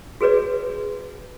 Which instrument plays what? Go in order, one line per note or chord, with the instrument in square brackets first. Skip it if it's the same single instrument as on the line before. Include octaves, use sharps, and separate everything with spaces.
[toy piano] F#4 G#4 B4 C#5 D5